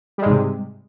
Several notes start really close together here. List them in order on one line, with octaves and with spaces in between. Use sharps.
G3 G#3 G#2 C3